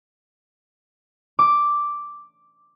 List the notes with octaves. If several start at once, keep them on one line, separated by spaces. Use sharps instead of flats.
D6